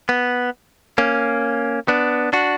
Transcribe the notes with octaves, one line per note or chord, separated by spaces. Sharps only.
B3
A#3 C#4
B3 D4
D4 F#4